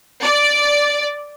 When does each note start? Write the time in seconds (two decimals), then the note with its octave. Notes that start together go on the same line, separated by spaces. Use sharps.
0.23 D5